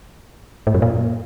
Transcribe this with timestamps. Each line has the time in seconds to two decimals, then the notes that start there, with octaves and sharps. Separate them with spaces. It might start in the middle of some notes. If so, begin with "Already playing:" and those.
0.67 A2
0.74 F#2
0.82 A#2